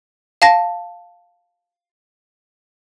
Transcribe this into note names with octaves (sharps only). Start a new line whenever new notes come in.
F5 A5 A#6